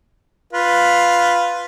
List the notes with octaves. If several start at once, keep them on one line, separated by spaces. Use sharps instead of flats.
F4 B4